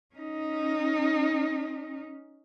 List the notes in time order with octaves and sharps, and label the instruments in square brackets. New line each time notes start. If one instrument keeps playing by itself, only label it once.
[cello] C#4 D#4